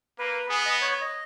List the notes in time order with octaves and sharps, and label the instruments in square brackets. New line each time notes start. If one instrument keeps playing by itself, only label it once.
[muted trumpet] A#3 [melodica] B4
[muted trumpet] B3 [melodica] G#4
[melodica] D#5
C#5
C#5
D#5